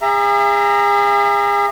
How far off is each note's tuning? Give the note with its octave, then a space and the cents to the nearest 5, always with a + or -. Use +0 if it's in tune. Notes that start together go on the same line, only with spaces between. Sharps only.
G#4 -35 E5 +35 A#5 +0